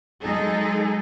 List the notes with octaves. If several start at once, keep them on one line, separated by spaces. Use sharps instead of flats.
F#3 G#3 D#4 G#4 A4